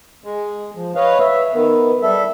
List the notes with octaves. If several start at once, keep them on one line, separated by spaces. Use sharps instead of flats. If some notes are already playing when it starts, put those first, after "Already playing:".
G#3
F3
B4 C#5 D#5 F5
E5
D#3 B3
G3 A4 E5